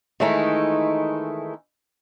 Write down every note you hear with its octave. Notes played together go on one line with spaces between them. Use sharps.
D#3 E3 G#3 A3 D#4 E4